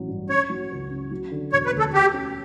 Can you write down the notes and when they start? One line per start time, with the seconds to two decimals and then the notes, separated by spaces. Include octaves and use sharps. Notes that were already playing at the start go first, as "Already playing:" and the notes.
Already playing: A1 F#3 C#4
0.08 G2
0.29 C#4 C#5
0.50 F#3
0.71 C#2
0.91 C#3
1.11 F#3
1.31 D3
1.52 E1 C#5
1.66 B4
1.72 D2
1.79 A4
1.93 F#4 G4
2.14 C#4